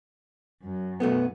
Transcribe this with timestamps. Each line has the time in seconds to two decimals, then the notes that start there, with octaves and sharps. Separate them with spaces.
0.63 F#2
1.00 B1 A3 B3